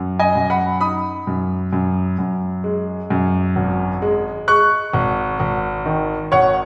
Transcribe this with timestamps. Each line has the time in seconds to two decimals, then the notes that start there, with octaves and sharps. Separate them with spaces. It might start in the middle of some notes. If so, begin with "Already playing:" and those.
Already playing: F#2
0.19 D#5 G#5
0.35 F#2
0.50 F#5 B5
0.81 D#4 B5 D#6
1.27 F#2
1.73 F#2
2.19 F#2
2.64 G#3
3.10 F#2
3.56 G#1
4.02 G#3
4.48 G#3 C#6 F#6
4.93 G#1
5.40 G#1
5.86 D#3
6.32 G#1 C#5 F#5